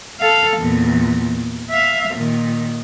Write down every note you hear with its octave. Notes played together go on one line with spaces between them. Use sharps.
A4 F5
E2 A#2
E5 F5
A#2 D#3